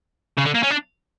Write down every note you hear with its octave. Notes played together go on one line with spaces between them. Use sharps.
C#3
D3
A#3
C#4
D4